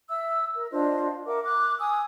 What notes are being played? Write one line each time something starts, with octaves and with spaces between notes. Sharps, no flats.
E5 E6
A#4
D4 F4 C5 D#5
A#4 E5 F#5 D6
D6 F#6
G#5 D#6 E6